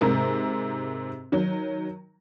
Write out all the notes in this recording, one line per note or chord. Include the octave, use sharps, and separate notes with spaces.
G#2 C3 A#4
D#3 F#3